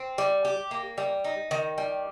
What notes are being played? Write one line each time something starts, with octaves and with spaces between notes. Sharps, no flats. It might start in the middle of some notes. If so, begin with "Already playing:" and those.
Already playing: C4
G3
G4
A#3
G3
D#4
D#3
G3